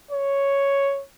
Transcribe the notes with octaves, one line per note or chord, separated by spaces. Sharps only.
C#5